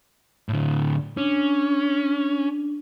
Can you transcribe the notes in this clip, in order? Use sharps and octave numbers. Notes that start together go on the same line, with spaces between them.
A2 D3
C#4 D4